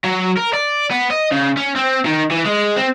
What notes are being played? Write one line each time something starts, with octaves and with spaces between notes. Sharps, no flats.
F#3
A#4
D5
B3
D#5
C#3
C#4
C4
D#3
E3
G#3
C4